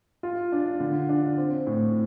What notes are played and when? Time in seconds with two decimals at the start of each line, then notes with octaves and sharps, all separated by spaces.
0.23 F4
0.52 D4
0.80 D3
1.09 D4
1.38 C4
1.67 A2